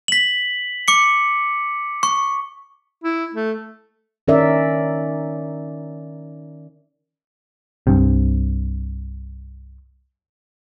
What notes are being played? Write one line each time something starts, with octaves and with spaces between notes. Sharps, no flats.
B6 F#7
D6 C#7
C#6
E4
A3
D#3 C#4 D#4 A#4 D5 E5
C2 G2 C3